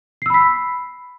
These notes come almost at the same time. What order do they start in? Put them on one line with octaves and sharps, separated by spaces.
C7 E6 B5 B6